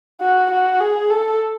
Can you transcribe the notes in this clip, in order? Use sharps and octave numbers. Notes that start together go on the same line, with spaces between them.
F#4
F#4
G#4
A4